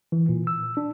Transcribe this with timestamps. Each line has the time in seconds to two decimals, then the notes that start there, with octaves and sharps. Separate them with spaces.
0.12 E3
0.29 A#2
0.47 E6
0.77 D4